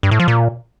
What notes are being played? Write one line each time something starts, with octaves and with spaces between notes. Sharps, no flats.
G2
A2
F3
A#2